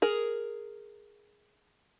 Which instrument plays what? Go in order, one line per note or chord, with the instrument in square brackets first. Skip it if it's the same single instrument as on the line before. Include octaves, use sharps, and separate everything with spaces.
[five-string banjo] G#4 A#4